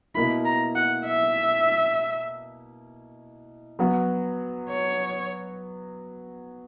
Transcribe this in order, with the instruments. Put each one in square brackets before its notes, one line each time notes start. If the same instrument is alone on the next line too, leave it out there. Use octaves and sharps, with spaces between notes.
[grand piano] B2 A#3 E4 [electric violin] B5
[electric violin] A#5
F#5
E5
[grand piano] F#3 B3 F#4
[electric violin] C#5